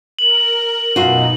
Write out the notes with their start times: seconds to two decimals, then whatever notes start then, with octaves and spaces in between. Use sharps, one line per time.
0.19 A#4 F#7
0.96 F#2 B2 D#4 F4 F#4